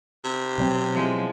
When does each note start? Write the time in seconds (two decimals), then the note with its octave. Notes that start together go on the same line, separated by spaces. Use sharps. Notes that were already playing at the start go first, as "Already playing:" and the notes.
0.24 C3
0.58 B2 F#3 C4
0.93 F3 G#3 E4